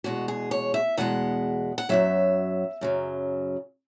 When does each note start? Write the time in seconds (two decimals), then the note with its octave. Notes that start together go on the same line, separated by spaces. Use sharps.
0.04 E2 B2 G#3 F#4
0.28 G#4
0.51 C#5
0.74 E5
0.97 E2 B2 G#3 F#5
1.78 F#5
1.89 F#2 C#3 F#3 E5
2.81 F#2 C#3 F#3